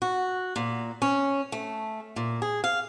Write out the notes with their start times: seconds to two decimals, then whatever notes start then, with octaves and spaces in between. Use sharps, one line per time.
0.02 F#4
0.56 A#2
1.02 C#4
1.52 A3
2.16 A#2
2.42 G#4
2.64 F5